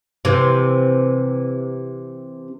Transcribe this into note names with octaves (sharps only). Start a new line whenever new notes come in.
C3 E3